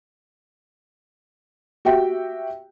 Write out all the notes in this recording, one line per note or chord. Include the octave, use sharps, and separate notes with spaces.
F#4 G4 E5 G5